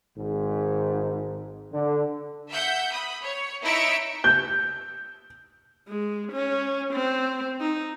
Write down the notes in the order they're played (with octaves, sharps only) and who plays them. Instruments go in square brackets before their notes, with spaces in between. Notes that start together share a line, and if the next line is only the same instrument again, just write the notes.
[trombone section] G#1 G#2
D3
[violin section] E5 F#5 G6
B5 D#6
C#5
D#4 E4 C#5 E5 C#7 D7
[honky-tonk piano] G6
[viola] G#3
C#4
C4
D#4